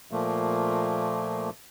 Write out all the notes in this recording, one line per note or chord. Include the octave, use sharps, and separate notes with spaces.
A#2 F3 A3 A#3